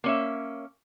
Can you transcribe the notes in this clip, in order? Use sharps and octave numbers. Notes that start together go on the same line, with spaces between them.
A#3 C#4 E5